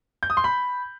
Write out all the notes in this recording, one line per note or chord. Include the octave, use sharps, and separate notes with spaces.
G6
D#6
C6
B5